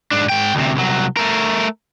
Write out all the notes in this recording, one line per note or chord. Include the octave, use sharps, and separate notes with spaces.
G#2 D4
G#2 G5
D2 C3
C2 F#3
A3 A#4